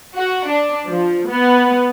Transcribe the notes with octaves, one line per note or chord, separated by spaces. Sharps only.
F#4
D4
F3
B3